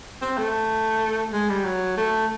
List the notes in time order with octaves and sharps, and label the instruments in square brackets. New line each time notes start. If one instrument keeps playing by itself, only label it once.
[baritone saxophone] C4
A3
G#3
G3
F#3
A3